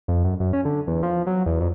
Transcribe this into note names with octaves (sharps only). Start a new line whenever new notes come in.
F2
F#2
F#2
C#4
D3
E2
F3
F#3
E2
F2